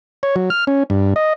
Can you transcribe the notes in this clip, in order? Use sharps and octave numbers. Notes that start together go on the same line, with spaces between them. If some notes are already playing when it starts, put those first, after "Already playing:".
C#5
F#3
F6
C#4
G2
D#5